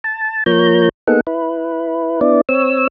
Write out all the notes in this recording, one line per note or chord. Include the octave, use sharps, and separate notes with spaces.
A5
F3 A#3 C#5 A#5 G6
A#3 B3 D#4 G#4 A4 F#5
E4 B4
B3 D4 E4 D5
C4 C#5 E6